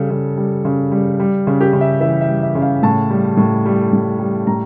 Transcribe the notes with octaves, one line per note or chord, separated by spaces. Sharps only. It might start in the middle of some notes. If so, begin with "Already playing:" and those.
Already playing: C#3 G3 A4
C#3
G3
C#3
G3
G3
C#3
G4
C#3
E5
E3 E5
E5
G3
E5
C#3
F5
A2 A5
G3
A2
G3
A2
G3
A2 A#5